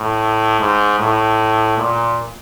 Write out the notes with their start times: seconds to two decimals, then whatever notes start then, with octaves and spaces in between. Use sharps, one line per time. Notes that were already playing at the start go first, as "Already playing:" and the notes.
Already playing: A2
0.60 G#2
0.99 A2
1.78 A#2